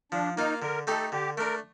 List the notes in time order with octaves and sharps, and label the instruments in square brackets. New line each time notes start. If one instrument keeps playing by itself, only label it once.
[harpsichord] F3 [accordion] D4
[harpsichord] A#3 F4 [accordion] D#4
[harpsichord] D3 [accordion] A#4
[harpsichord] A3 D#4 G4 [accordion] A4
[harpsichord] D3 [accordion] G4
[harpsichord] A3 D4 [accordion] A#4